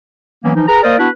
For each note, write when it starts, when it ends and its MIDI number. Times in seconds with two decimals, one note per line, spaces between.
0.44 0.51 52
0.44 0.51 54
0.44 0.51 58
0.44 0.51 59
0.44 0.51 61
0.56 0.65 52
0.56 0.65 53
0.56 0.65 63
0.68 0.81 68
0.68 0.81 71
0.68 0.81 82
0.83 0.98 58
0.83 0.98 70
0.83 0.98 72
0.83 0.98 74
0.83 0.98 75
0.98 1.08 59
0.98 1.08 62
0.98 1.08 64
0.98 1.08 66
0.98 1.08 71